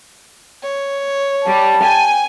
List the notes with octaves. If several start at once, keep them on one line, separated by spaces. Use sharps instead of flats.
C#5
G3 A5
G5 G#5